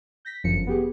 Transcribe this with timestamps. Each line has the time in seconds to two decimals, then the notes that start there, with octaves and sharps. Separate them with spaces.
0.25 G6 A#6 B6
0.44 G1 F#2 F3 C#7
0.67 B3 G4 G#4